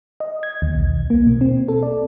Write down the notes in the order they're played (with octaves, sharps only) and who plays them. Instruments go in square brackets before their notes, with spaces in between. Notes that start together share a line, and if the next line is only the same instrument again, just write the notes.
[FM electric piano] D#5
G#6
D#2
B1
A#3
B2
C4
A4
D5